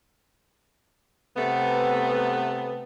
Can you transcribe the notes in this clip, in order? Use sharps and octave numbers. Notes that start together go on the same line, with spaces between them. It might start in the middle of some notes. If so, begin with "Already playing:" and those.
C3 A3 B3